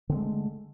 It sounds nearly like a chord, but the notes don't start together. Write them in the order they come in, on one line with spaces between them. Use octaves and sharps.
D3 C4 G#3 A3